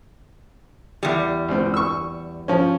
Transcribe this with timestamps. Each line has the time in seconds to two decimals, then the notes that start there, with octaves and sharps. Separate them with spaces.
1.03 E2 G3
1.48 C#2 C4
1.74 C#6 E6
2.48 F3 C#4